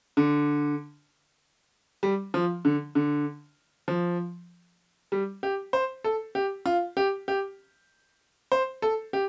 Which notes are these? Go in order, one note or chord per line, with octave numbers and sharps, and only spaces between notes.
D3
G3
F3
D3
D3
F3
G3
G4
C5
A4
G4
F4
G4
G4
C5
A4
G4